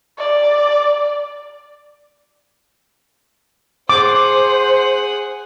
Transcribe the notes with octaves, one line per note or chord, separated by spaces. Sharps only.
D5
G#4 C5 F#5 D6